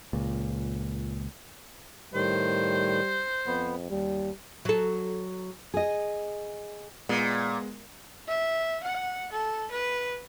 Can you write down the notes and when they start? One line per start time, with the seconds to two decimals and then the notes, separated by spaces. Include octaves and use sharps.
0.13 C#2 A#2
2.14 A2 D#3 G3 C5
3.47 F2 B3
3.90 D#2 G3
4.65 F#3 A4
5.74 G#4 D#5
7.09 A#2 G#3 B3 C7
8.28 E5
8.83 F#5
9.32 A4
9.71 B4